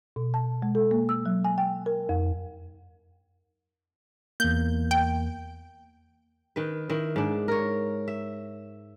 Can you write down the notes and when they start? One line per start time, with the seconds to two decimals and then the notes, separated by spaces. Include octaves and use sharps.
0.16 B2
0.34 A5
0.62 G#3
0.75 A4
0.91 A#3
1.09 E6
1.26 F#3
1.45 G#5
1.58 G5
1.86 A#4
2.09 F2
4.40 E2 A#3 G6
4.91 G5
6.56 D#3 B4
6.89 D#3 E4
7.16 G#2 D4
7.48 A#4 C#5
8.08 E5